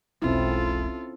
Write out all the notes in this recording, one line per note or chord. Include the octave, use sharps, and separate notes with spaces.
E1 B1 C4 C#4 E4 F4 A4